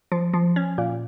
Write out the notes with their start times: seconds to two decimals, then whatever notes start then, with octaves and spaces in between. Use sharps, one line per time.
0.12 F3
0.34 F3
0.56 C#4
0.78 A#2